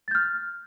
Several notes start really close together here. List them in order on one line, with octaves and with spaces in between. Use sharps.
A6 G6 F6